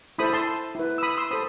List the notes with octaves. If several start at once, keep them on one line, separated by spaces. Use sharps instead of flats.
E4 A4 C5 B5 D#6
A5 C6
E4 B4
E6
B5 D#6
C6 E6
A4 C5 B5 D#6